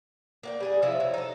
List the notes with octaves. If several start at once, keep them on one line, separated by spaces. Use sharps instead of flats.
A#3 F#5 G5
G3 G#4 F#5
C3 F3 E4 E5
F#3
D#4 A4